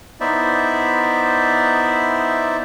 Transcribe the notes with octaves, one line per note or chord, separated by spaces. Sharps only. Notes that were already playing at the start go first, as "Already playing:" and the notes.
B3 D#4 E4 C5 D5 E5